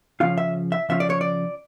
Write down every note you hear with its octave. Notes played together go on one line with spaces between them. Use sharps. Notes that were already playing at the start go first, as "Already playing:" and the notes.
C#3 F3 C#4 F4 F5
E5
E5
C#3 F3 C#4 F4 E5
D5
C#5
D5